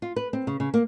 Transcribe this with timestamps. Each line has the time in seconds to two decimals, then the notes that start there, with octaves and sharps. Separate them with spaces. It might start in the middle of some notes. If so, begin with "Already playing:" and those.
0.02 F4
0.16 B4
0.33 C4
0.47 C#3
0.60 C#3
0.74 A#3